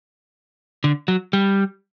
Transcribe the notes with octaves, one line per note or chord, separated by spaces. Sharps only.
D3
F#3
G3